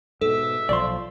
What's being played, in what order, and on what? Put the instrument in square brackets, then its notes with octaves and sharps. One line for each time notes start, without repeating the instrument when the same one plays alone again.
[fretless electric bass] G#2 B2 [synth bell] A4 [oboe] E5
[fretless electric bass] B1 F3 [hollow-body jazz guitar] D5 C6